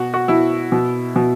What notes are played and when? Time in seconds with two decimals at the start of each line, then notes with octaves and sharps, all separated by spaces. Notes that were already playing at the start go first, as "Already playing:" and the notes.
Already playing: B2 F#4
0.14 F#4
0.28 B2 E4
0.72 B2
1.16 B2